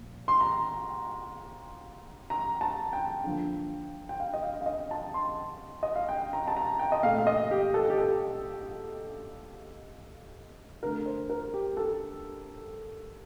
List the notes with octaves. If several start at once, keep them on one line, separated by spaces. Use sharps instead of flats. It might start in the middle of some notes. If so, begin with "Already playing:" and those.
Already playing: A#2 F3
C6
A#5
A#5
A5
G5
D3 F3 A#3
G5
F5
D#5
F5
F5
D#5
A5
C6
D#5
F5
G5
A#5
A5
A#5
G5
D#5
A#2 A3 F5
F5
D#5
G4
A4
G4
A4
D3 A3 A#4
C5
A#4
G4
A4